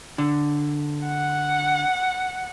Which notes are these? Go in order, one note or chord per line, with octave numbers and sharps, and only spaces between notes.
D3
F#5